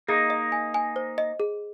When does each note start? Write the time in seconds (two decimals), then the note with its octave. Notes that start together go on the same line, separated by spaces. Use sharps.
0.08 A#3 D#4 G#4
0.30 D#5
0.52 G#5
0.74 G#5
0.96 C5
1.18 D#5
1.40 G#4